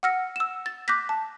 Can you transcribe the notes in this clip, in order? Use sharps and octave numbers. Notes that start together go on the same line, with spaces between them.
F#5 E6 F6 A#6 C#7
E6 E7
A6
D6 F#6 G6 A#6 B6
A5